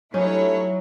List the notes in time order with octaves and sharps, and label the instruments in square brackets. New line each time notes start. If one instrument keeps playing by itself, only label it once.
[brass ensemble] G2 A3 [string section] F#3 [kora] C#4 D#4 [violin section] E4 C#5